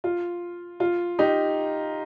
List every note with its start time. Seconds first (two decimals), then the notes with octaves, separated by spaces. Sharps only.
0.04 F4
0.80 F4
1.19 D#4 G4